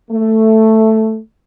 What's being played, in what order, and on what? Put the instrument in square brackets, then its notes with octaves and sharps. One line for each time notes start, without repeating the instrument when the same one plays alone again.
[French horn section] A3